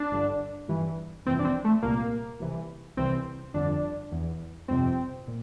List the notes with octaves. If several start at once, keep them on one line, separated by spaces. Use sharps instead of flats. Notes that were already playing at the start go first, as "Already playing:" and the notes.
Already playing: D4
G1 G2 D3
G1 G2 E3
G1 F2 C3 E3 C4
D4
C4
A3
C2 A#2 A#3
C2 C3 E3
C2 C3 E3 C4
G1 F2 D3 D4
E2 E3
G1 F2 C3 C4
A#2